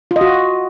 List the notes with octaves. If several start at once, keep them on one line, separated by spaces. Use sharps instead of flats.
F4
D#5
F#4